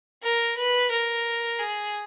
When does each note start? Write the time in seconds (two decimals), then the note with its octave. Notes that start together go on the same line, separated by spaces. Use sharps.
0.23 A#4
0.57 B4
0.91 A#4
1.59 G#4